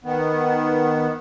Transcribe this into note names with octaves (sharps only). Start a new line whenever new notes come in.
D#3 B3